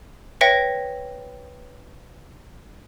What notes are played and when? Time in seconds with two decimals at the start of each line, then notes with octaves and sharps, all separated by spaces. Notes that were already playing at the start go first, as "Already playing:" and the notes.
0.41 B4 C#5 E5 G5 A#6 C#7